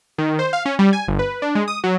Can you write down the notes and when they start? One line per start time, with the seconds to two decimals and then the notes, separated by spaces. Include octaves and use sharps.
0.18 D#3
0.39 C5
0.53 F5
0.65 C#4
0.79 G3
0.93 G#5
1.08 G1
1.19 B4
1.42 D4
1.55 G#3
1.68 D#6
1.84 F#3